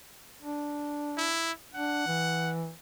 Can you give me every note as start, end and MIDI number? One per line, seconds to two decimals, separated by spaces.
0.42 1.35 62
1.17 1.52 64
1.74 2.04 62
1.74 2.51 78
2.07 2.71 52